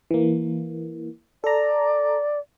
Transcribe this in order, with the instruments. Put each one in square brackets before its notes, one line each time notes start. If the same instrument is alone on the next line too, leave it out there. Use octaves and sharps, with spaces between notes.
[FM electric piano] E3 A#3
[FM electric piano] A4 A#5 [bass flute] D5